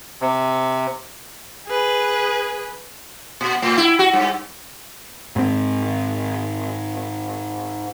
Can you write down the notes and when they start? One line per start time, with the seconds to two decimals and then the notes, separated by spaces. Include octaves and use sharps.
0.21 C3
1.67 G#4 B4
3.41 A#2
3.62 A2
3.78 E4
3.99 F#4
4.13 G2
5.36 G#2 C4